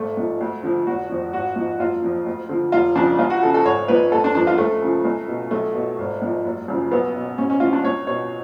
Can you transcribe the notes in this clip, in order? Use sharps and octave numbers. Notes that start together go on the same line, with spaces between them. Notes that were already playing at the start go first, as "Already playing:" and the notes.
Already playing: G#1 A3
G#2 F3
D2
D3 F3
F1 F#4
F2 F3
G#1 F#4
G#2 F3
F#1 F4
F2 F3
D2
D3 F3
F1 F4
F2 C#3 F3 D4
C#2 F4
F#4
C#3 F3 A4
A4
G#1 C#5
G#2 F3 B4
F#1 A4
D4
F2 F3 D4
F4
C#2 A3
C#3 F3
C#2
B2
B1 A3
B2
G#1
G#2 F3
F#1
F#2 C#3 F3
B1 B3
B2
A1 C#4
C#4
A2 F3 F4
D4
C#2 C#5
B2 C#5